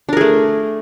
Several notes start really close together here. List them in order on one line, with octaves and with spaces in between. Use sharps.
D4 A#4 G#4 A3